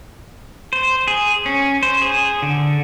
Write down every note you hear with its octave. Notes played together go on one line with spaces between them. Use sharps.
C5
G#4
C#4
C5
G#4
D3